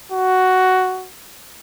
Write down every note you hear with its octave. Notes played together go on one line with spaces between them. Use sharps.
F#4